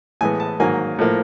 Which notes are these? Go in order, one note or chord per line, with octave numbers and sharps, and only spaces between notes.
A2 E3 G#3 B3 G#5
A5
G#2 D#3 F#3 A#3 G#5
A2 F3 A#3